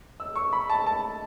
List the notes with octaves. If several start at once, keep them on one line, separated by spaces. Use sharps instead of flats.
E6
C#6
B5
A5
A5